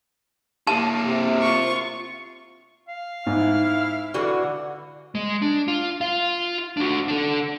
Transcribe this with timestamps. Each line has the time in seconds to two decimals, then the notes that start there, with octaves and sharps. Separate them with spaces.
0.67 A#3 E4 A5
1.03 C3
1.42 F4 C#6
2.88 F5
3.27 G#2 E4 F6
4.14 D3 E3 F#4
5.15 G#3
5.42 D4
5.68 F4
6.01 F4 F5
6.77 D4 F#4
7.08 D4 A4